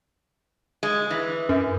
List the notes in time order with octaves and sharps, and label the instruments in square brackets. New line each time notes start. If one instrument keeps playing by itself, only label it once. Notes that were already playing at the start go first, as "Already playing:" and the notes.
[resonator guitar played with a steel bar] G#3
E3
[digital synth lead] F#2